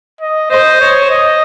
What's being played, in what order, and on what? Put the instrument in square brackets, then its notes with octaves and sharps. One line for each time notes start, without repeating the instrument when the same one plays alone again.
[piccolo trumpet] D#5
[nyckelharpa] C5 [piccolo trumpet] D#5
[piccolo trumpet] C#5
D#5